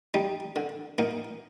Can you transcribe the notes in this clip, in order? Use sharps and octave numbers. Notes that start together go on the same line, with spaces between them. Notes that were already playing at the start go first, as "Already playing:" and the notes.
G3 D#4
D3
A#2 D#4